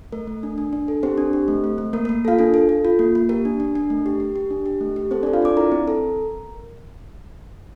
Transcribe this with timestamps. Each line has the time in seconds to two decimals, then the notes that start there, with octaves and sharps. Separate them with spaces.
0.12 A3 A#4
0.27 A3
0.43 D4
0.58 D4
0.73 D4
0.88 A4
1.03 C4 G4 C5
1.18 D4
1.33 G4
1.48 A3
1.64 A3
1.78 A3
1.93 A#3 A#4
2.05 A#3 A#4
2.25 F4 A4 F5
2.39 D4 A4
2.54 A4
2.69 A4
2.85 F4
2.99 A#3
3.15 A#3
3.29 G4 A#4
3.45 D4
3.60 D4
3.75 D4
3.90 A3
4.06 G4
4.20 G4
4.36 G4
4.51 D4
4.66 G4
4.81 A3
4.96 G4
5.11 C4 A4 C5
5.23 D4 A4 D5
5.33 F4 F5
5.42 D4 D5 D6
5.57 E4 A#4 A#5
5.72 C4
5.88 A4